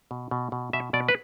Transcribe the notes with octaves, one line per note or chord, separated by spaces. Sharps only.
B2
B2
B2
B2 E5
B2 D5
B4